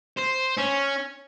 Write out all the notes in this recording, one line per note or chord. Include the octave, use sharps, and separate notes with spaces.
C5
C#4